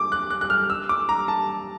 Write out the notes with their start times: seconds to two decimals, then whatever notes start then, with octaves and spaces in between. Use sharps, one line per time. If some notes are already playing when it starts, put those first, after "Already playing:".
Already playing: D6
0.12 F#6
0.30 F#6
0.41 F#6
0.50 F6
0.70 E6
0.89 D6
1.09 A#5
1.28 A5